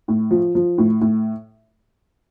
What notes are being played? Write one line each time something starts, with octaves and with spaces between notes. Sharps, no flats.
A2
F3
F3
A2
A2